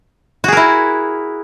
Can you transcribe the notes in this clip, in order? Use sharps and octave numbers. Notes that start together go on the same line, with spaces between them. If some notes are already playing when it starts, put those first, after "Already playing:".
E4 F#4 G#4 A#4